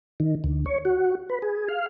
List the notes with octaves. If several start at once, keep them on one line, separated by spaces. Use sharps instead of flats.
D#3
D2
C#5
F#4
B4
G#4
F5